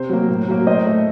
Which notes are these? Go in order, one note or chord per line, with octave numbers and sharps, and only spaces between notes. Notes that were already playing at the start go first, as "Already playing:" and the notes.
Already playing: C3 C5
F#3 A#3
A2
F#3 A#3
A2 C5 D#5
A3